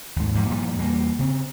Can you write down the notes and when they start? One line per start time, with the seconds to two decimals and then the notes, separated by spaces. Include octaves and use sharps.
0.16 D#2 G#2
0.35 E2 G#2 E3 F3
0.49 G2 A#2 F3 G3
0.78 E2 G3 A#3
1.19 C#3 C4